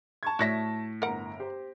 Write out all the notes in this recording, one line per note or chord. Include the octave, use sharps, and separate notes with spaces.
A5 C#6 G#6
A2 F#4 D5 E5 A#6 B6
G1 A#4 F#5 A#5 D7
G4 C5